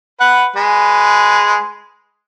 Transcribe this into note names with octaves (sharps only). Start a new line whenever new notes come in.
B4 F#5
G#3 B4